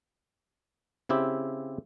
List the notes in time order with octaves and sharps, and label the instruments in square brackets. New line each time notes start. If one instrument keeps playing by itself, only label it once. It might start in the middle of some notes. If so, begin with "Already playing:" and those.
[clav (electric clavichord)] C#3 C4 E4 G4